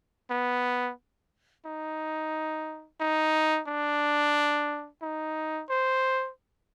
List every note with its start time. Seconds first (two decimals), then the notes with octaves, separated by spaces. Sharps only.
0.30 B3
1.66 D#4
3.00 D#4
3.67 D4
5.02 D#4
5.70 C5